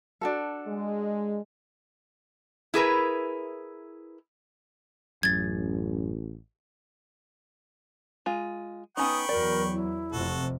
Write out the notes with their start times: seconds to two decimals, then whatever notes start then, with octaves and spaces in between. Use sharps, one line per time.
0.21 D4 F#4 A4
0.67 G#3
2.74 E4 G#4 A#4 B4
5.23 A1 F#2 G#6 A6
8.26 G#3 F4
8.97 B3 C#4 D#4 G5 B5 C#6 D#6
9.29 E2 F#3 A#4 D5
9.72 E4
10.13 F1 F2 C3 F#4 A4